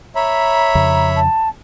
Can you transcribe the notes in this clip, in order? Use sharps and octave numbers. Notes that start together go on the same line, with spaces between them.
C#5 E5 A#5 B5
F2 C#3
A5